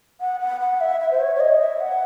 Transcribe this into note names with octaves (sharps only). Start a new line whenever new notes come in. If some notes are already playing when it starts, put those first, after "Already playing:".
F#5
F#5
F#5
E5
E5
C5
C#5
C#5
D#5
E5
F#5